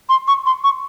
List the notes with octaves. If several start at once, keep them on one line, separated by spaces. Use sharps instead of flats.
C6
C#6
C6
C#6